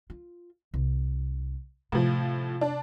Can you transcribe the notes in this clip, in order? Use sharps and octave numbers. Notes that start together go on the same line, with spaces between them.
F4
C2
A2 C3 F3
D4